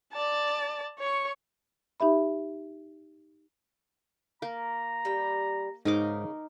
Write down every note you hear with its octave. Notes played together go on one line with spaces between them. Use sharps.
D5 A5
C#5 C#6
D#4 G4 E5 B5
A#3 A#5
G3 G5
G#2 C#3 D#4 G#4 A#4 D6